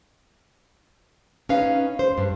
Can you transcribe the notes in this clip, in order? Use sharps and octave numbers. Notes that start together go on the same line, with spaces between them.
C#4 D#4 B4 F5
C5
G2